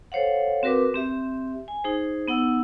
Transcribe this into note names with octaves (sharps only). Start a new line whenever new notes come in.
A4 C5 C#5 F5 F#5
C4 F#4 A#4 B4 D6
C4 G4 E5
G#5
D#4 G#4 C5
B3 D#4 F#5 E6